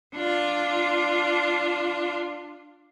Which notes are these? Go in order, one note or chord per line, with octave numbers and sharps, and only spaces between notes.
D4 F4